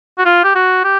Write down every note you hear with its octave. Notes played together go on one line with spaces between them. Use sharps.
F#4
F4
G4
F#4
G4